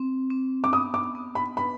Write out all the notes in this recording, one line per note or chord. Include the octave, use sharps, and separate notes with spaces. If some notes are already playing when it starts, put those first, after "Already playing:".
Already playing: C4
C4
D6
B3 D#6
D6
B3
B5
B4 B5